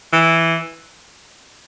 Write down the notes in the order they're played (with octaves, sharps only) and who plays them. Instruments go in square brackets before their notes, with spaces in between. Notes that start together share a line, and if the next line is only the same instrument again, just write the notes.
[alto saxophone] E3